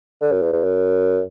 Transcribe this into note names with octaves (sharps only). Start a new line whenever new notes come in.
D3
F#2
E2
E2
F#2